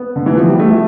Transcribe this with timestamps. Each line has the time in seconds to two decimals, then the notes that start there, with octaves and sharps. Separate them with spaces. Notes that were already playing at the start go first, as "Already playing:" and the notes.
Already playing: B3
0.16 D3
0.26 E3
0.37 F3
0.48 G3
0.59 A3